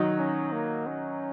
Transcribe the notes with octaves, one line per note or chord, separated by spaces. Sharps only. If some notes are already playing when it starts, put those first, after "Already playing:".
Already playing: D#3 F#3 D#4
C#4
A#3
C#4